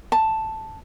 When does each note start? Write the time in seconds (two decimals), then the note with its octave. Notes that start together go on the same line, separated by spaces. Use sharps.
0.12 A5